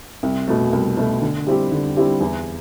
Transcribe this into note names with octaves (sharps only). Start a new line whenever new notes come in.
C2
B2 A3
C2
B2 A3
D3
G3 C4 E4 G4
D3
G3 C4 E4 G4
E2